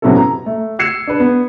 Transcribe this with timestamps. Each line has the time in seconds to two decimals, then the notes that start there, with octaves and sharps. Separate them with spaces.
0.02 C3 F#3 B3 C#4 E4 A4
0.16 A#5
0.46 A3
0.79 E6 G#6 C7 C#7 E7
1.07 D4 B4
1.20 B3